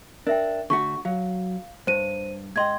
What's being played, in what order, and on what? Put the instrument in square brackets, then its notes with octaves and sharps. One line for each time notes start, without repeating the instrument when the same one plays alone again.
[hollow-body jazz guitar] D4 [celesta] A#4 E5 G5
[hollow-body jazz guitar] D3 A3 F#4 [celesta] C#6
[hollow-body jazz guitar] F#3 [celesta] F5
[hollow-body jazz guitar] G2 [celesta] C5 D#7
[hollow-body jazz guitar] G#2 D#5 [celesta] G5 C6 G#6